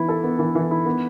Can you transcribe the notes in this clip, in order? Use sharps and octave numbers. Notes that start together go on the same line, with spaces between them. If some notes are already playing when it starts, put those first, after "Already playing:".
Already playing: E3 B3 E4
A4
B3
E3
E3
E4
B3